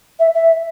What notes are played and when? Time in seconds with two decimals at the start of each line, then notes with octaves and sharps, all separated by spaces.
0.20 E5
0.35 E5